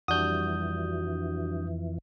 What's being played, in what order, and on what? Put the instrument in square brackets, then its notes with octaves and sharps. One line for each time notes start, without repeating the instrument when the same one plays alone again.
[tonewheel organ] F2 E3 [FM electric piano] G3 D4 F#4 [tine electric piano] D#6 G6